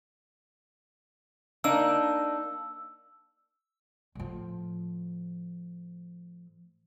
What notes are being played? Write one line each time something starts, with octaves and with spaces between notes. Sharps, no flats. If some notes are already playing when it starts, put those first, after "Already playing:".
A#3 D4 D#4 E6
A2 F3